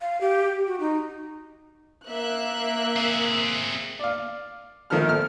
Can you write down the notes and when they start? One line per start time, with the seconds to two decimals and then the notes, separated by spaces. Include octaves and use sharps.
0.01 F5
0.21 G4
0.67 F#4
0.80 D#4
2.07 A#3 E5 F#6
2.96 C4 G#4
3.99 D5 F5
4.90 A#1 D#3 F3 A3 A4 F6
5.09 F6